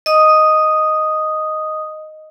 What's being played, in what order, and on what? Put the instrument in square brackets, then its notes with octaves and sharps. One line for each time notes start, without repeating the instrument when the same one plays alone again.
[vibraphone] D#5 D#6